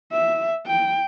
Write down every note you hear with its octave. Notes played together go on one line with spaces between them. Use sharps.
E5
G5